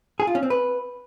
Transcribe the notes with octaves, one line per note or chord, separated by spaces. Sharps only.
G#4
F4
C#4
C4
B4